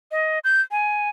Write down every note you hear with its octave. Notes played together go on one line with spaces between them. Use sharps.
D#5
G6
G#5